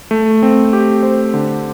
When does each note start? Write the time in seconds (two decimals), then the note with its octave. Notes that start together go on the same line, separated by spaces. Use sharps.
0.11 A3
0.43 C4
0.73 G4
1.03 C5
1.34 D3